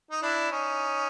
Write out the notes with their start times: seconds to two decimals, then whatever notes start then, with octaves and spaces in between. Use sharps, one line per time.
0.11 D#4
0.23 D4 E4
0.51 C#4 D#4